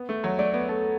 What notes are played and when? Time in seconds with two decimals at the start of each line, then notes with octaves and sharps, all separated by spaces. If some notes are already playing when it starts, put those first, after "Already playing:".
Already playing: B3
0.09 A3
0.24 F#3
0.39 A3 D5
0.54 B3 D5
0.69 A3 A4